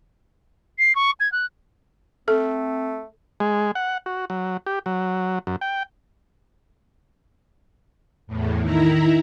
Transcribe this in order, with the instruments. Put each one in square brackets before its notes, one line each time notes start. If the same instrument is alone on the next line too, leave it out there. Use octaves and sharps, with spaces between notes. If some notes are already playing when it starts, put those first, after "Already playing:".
[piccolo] C7
C#6
G#6
F#6
[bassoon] A3 [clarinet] C4 [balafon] A4
[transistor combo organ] G#3
F#5
F#4
F#3
G4
F#3
F#2
G5
[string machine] E2 A2
D#3 E4 A#5